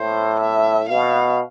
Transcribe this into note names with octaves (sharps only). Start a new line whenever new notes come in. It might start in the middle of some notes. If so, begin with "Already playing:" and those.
Already playing: A2 C5
E5
B2 F5